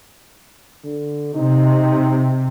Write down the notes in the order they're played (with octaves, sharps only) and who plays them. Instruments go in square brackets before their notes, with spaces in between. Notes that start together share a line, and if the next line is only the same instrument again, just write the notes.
[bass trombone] D3
[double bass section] C3 [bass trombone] D#4